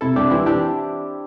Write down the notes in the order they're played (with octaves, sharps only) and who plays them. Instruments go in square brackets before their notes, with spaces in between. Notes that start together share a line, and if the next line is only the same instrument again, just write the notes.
[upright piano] C3 [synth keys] E4 A4
[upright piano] C2 [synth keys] D4 G4
[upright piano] E3 [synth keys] C4 E4
[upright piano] E3 [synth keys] D4 G4